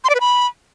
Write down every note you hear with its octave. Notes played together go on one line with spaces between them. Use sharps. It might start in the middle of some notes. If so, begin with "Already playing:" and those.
C6
D5
B4
B5